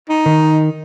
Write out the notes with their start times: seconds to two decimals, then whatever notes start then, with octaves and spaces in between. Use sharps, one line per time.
0.09 D#4
0.26 D#3